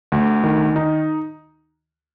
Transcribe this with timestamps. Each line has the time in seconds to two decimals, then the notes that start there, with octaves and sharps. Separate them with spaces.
0.12 D2
0.44 D#3
0.76 D#4